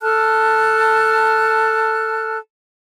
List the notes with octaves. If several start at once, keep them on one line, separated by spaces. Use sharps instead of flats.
A4 A5 F6 F#6